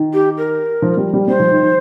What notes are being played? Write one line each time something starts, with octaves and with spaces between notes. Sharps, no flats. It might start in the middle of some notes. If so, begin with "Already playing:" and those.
Already playing: D#3
G4
A#4
F3
G3
G3
G3 C5
F3
D#3
D#3